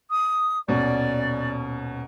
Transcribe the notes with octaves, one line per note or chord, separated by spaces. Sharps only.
D#6
D#1 B2 C#4 D5